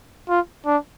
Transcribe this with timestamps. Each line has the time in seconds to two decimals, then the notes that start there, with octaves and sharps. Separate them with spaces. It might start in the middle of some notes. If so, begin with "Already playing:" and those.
0.29 F4
0.66 D4